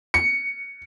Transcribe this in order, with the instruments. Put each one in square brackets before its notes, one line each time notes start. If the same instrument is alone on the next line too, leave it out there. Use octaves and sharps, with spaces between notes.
[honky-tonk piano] C#7